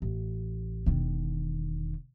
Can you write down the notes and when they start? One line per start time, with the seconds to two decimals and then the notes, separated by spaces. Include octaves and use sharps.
0.02 A1
0.86 E1 D#3